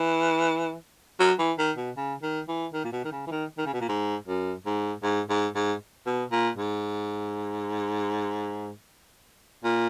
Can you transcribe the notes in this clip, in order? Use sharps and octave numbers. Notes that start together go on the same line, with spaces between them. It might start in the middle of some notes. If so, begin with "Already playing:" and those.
Already playing: E3
F#3
E3
D#3
B2
C#3
D#3
E3
D#3
A#2
B2
D#3
C#3
E3
D#3
D#3
C#3
B2
A#2
G#2
F#2
G#2
G#2
G#2
G#2
B2
A#2
G#2
A#2